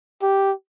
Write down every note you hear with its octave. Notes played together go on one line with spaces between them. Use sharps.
G4